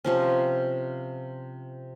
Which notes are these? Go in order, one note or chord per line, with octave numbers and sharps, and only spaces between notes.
C3 F3 C#4